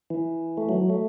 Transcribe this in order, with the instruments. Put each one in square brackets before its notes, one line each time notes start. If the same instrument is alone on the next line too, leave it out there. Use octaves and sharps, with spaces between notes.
[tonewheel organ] E3
A3
F#3
A3